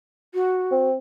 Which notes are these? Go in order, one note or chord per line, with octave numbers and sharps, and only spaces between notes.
F#4
C4